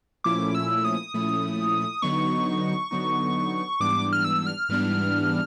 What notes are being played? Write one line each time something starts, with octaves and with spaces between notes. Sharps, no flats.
A#2 F3 A3 C#4 E4 D6
E6
D#6
A#2 F3 A3 C#4 E4
D3 F#3 B3 D#4 C#6
D3 F#3 B3 D#4
G#2 E3 G3 B3 D4 D6
F6
E6
F6
G#2 E3 G3 B3 D4